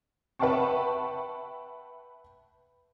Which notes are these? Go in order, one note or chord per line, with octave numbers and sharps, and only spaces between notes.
B4 E5 F#5 G5 A5 C#6